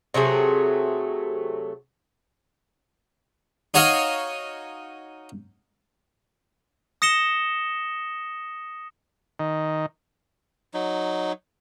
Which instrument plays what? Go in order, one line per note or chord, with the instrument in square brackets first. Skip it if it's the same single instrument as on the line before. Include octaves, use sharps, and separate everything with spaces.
[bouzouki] C3 F#3 A3 G#4
[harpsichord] D#4 F#4 C#5 D#5 F5
[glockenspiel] D#6 A#6 C#7 E7 G7
[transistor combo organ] D#3
[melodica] F#3 D#4